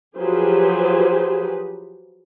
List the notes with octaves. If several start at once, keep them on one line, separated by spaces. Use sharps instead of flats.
F3 F#3 G4 G#4 B4 C5